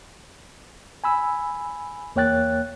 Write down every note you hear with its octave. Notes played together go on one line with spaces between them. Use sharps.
G#5 B5 E6
E2 A#3 C#5 G5 F#6 A6